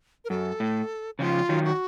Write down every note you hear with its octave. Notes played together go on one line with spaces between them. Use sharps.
A#4
F#2 A4
A2
C#3 F3 F4
D#3 F#3
F#4